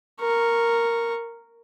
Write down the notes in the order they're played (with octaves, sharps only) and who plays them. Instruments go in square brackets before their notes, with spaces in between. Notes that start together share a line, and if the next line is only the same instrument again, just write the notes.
[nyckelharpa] A#4 C#6